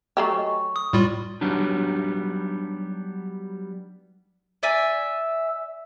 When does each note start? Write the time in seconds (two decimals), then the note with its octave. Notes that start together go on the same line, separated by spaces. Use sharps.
0.17 F#3 A3 G4 A#5 C#6
0.34 D#5 G#5
0.47 C#6
0.76 D#6
0.93 A2 G3 F4
1.41 F#3 G3 B3 D4 D#4
4.63 D5 E5 G#5